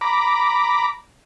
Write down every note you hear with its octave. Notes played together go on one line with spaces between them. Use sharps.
A#5 B5 D6